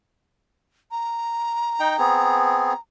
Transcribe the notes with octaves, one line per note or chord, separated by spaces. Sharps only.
A#5
D#4 G5
B3 C4 G#4